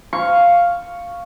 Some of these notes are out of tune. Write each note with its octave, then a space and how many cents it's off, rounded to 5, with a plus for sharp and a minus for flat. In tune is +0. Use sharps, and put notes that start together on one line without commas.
F5 +0 C#6 +0